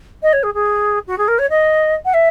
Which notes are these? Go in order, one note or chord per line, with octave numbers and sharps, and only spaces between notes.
D#5
C#5
G#4
G#4
F#4
G#4
A#4
C#5
D#5
F#5
E5